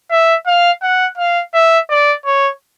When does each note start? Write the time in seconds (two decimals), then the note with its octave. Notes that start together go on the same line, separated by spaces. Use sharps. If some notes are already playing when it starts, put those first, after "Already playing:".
0.11 E5
0.46 F5
0.82 F#5
1.18 F5
1.54 E5
1.90 D5
2.26 C#5